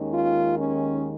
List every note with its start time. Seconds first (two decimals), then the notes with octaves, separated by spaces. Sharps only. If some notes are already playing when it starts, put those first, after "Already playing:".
Already playing: D#2 D#3 G#3 C#4
0.13 F4
0.59 C#4